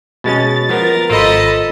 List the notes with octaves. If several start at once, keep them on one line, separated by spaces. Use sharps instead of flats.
B2 G#3 C#4 A6
F3 B3 A#4
G#1 F4 A4 A#4 C5 D#5 B5